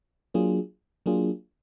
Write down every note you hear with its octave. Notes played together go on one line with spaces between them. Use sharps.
F#3 A#3 D4 F4 G#4
F#3 A#3 D4 F4 G#4